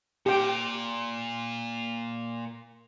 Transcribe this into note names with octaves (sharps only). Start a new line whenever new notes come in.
A#2 G4 G5